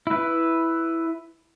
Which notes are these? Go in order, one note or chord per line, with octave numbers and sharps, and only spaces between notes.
E4 B4